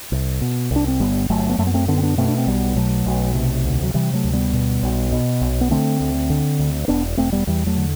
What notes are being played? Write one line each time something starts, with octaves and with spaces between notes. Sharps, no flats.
C2
B2
C2
D4
C4
G1 G3 B3
G1 F#3 A3
B3
F#2 F#3 A3
B3
A3 C4
D3 B3 D4
C4
B3 D4
B2 A3 C4
D4
C4
B1 G3 B3
B2 F#3 A3
B1
C3
D2
F#3
C3 E3 G3
F#3 A3
D2
G3 B3
B2
B1
B2
B1
B3
D3 A3 C4
D2
D3
D2
E1 B3 D4
E1 A3 C4
G3 B3
E2 E3 G3
F#3 A3
D3